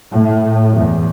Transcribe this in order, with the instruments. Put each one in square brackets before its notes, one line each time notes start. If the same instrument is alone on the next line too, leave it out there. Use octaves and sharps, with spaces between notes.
[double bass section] A2
E2